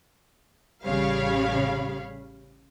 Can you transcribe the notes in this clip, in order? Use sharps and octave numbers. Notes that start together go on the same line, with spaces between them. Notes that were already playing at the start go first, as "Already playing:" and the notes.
A1 C#3 G3 C#5 F5 B5